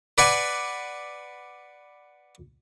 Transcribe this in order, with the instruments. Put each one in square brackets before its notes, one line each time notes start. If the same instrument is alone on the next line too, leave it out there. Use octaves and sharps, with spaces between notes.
[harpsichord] B4 D5 F#5 G#5